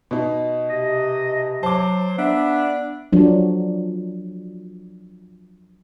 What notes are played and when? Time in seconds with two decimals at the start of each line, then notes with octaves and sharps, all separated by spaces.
0.11 B2 D#4
0.69 C3 D#5
1.63 F#3 C5 A5 D6
2.18 B3 D4 E5
3.13 F3 F#3 D4